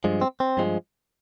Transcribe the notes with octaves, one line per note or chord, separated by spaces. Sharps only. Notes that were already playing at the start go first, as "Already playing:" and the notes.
G2 F3 G#3
C4
C4
G2 F3 G#3